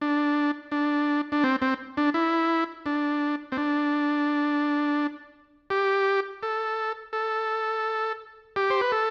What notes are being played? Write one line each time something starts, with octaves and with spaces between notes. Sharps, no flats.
D4
D4
D4
C4
C4
D4
E4
D4
C4
D4
G4
A4
A4
G4
C5
B4
A4